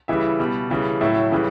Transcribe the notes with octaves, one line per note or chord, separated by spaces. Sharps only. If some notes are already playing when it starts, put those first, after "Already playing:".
C#3 E3 G3 E4 E5
B2 G3
C#3 E3 G3
A2 F#3 E4 E5
C#3 E3 G3